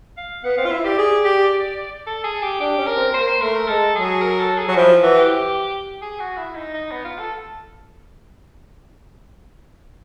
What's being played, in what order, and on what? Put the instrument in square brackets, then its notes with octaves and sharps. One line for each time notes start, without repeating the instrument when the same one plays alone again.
[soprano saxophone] F5
[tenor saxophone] B3 [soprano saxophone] F#5
[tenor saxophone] C4 [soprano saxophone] F5
[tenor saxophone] F4
[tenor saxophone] E4 [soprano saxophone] E5
[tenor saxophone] G4 [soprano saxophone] D5
[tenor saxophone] G#4
G4
[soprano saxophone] A4
G#4
G4
[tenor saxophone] D4 [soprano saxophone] G4
[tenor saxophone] C#4
[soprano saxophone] A#4
[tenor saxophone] C4
[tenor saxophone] A#3 [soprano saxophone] C5
[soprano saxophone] C5
[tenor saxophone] A3 [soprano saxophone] A#4
[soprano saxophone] A#4
[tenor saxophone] G#3 [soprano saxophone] A4
[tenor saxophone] F#3 [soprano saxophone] G#4
[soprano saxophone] A#4
A4
G#4
[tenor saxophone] F#3
[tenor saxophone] F3 [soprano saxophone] E4
[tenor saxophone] E3 [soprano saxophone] F#4
[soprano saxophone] G4
G#4
F#4
E4
D#4
D#4
B3
F4
A4